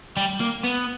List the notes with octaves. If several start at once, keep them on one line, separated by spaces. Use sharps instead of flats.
G3
A#3
B3